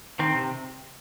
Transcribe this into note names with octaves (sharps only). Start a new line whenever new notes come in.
D#3 C4
C3